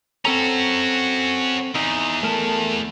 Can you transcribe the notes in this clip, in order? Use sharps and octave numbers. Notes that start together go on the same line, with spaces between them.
C4 C#4 F#4 A4 A#5
E2 D#4
A3 A#4 A5